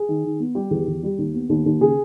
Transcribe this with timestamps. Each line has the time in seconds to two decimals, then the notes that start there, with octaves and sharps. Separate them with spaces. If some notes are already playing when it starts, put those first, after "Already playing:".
Already playing: G#4
0.09 D#3
0.24 D#3
0.40 B3
0.55 G3 G4
0.71 E2
0.88 E2
1.03 G3
1.18 D#2
1.34 B3
1.49 D#2
1.66 D#2
1.81 C#3 G#4